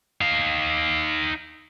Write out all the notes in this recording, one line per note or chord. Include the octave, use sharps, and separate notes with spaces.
D#4 F5